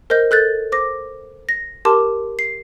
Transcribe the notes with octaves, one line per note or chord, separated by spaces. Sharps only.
A#4 C5 D#5 G6
A4 F#6 G6 A6
C5 D6 A#6
A#6
G4 A#4 A5 C6 D6
C7